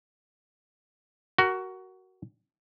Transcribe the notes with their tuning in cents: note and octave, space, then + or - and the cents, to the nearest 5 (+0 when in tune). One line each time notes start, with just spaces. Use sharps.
F#4 +15 A#4 +0